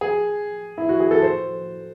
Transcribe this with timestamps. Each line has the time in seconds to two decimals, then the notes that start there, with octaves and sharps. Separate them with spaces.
0.01 G#4
0.78 E4
0.89 F#4
1.00 G#4
1.11 A4
1.22 C5